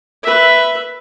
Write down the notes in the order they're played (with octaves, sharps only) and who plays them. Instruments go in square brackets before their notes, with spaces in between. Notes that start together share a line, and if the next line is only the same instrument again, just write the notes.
[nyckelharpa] B4 E5